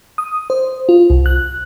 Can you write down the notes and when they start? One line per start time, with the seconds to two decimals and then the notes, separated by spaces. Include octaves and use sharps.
0.18 D#6
0.50 C5
0.89 F4
1.10 C2
1.26 F#6